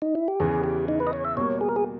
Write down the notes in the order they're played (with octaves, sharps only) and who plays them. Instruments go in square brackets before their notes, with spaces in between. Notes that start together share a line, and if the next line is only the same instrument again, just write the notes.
[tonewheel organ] D#4
E4
G4
[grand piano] E2 C#3 E3 [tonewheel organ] G#4
[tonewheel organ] G4
D#4
B4
D#5
C#5
E5
[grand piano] B2 G3 A#3 [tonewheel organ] C#5
[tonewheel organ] G#4
A#4
G#4